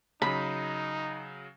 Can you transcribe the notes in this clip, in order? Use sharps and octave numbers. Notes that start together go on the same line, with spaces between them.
C#3 F#3 D#4 B5